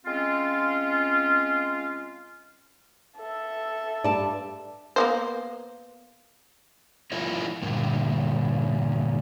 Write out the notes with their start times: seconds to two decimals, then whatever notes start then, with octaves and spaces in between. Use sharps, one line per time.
0.06 G#3 C4 C#4 F4
3.18 A4 E5
4.04 G2 D5 A5
4.96 A#3 B3 C5
7.12 E4 F4 A#4 C#5 D#5
7.62 G2 A#2 D3